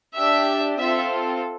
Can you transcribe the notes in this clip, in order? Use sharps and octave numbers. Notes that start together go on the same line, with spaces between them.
D4 G4 E5
C4 F4 A4 E5